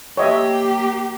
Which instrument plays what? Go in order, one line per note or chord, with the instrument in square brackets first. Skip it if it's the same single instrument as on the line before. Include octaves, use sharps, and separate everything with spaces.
[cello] A#3 G4 [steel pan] C#5 D#5 E5